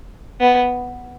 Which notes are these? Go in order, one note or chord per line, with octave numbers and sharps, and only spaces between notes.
B3